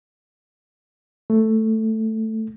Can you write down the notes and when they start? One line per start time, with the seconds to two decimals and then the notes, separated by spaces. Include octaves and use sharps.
1.30 A3